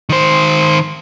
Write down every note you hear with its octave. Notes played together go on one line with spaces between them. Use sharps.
D#3 C5